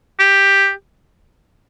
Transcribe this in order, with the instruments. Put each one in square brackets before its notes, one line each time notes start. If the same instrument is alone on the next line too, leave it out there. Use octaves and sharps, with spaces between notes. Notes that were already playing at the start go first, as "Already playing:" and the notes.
[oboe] G4